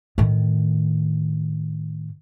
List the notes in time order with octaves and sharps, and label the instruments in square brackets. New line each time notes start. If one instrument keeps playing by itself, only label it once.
[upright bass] A2 D#3